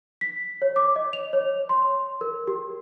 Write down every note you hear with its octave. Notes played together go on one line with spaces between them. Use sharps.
B6
C#5
D6
D#5
F7
C#5
C6
A#4
G4